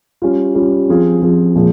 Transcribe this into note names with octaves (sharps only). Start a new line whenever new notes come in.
G3 C#4 F4
G3 C#4 F4
F3 C4 F4 G#4
F3 C4 F4 G#4
A#2 F3 G#3